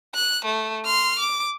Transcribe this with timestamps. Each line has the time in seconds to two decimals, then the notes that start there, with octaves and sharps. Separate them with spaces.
0.14 F#6
0.45 A3
0.85 C6 F6
1.19 D6